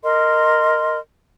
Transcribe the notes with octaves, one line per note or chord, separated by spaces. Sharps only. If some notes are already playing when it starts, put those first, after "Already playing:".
A#4 D#5 C6